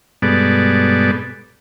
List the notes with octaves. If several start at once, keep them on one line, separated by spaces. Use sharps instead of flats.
G2 B2 G#3 B3 A4 D5